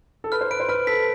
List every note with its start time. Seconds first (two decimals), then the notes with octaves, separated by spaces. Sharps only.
0.24 A4
0.32 B4 F6
0.41 C5
0.51 B4 D7
0.60 C5
0.69 B4 F6
0.87 A4 B6